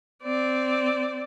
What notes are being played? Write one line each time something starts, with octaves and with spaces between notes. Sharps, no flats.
C4 D5